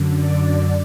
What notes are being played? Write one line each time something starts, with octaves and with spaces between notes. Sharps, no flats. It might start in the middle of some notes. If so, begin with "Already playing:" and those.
Already playing: F#2 D3
D5